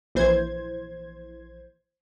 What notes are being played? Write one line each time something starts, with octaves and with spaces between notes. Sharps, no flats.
A#1 E3 C5 G#6